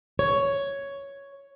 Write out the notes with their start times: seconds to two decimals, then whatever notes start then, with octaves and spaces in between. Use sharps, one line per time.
0.19 C#5